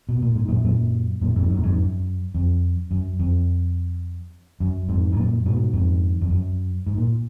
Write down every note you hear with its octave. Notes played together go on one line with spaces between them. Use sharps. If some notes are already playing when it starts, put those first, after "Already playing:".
B2
A#2
G#2
F#2 A#2
F#2 A#2
F#2 A#2
F2 G#2
F#2
A#2
F2 G#2
F#2
F2
F#2
F2
F#2
F2 G#2
G#2
F#2 A#2
G#2 B2
F2 G#2
F2
F#2
G#2
A#2